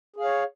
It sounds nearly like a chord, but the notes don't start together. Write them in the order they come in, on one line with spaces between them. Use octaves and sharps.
G#4 F5 C#5